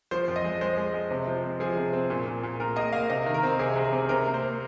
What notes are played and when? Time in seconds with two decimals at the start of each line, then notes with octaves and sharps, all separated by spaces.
0.11 F3 C5
0.28 F2
0.36 D#5
0.44 G#3
0.61 G#3 C5
0.77 G#3
0.94 G#3
1.11 C3
1.27 F3
1.44 C4
1.60 F3 G#4
1.77 C3
1.93 C4
2.10 A#2
2.27 A#2
2.43 A#2
2.60 A#2 A#4
2.76 A#3 D#5
2.93 A#3 F5
3.10 C3 D#5
3.26 D#3
3.34 A#4
3.43 C4
3.59 C3 G#4
3.76 C3
3.84 G#4
3.92 C3
4.09 C3 A#4
4.26 A#3
4.34 C5
4.43 A#3